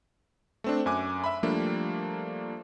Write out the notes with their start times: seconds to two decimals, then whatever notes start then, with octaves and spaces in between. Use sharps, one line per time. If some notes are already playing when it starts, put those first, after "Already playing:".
0.64 A3 C4 D4
0.86 F#2 G#5 D6 F#6
1.24 E5 B5
1.43 F3 G3 A3 A#3 D4